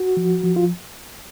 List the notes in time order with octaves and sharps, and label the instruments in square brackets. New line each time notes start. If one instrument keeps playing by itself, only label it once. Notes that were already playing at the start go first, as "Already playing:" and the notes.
Already playing: [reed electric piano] F#4
F3
F3
F4